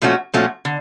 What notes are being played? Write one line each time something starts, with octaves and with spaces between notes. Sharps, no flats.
A#2 F3 A3 C#4 F#4
A#2 F3 A3 C#4 F#4
D3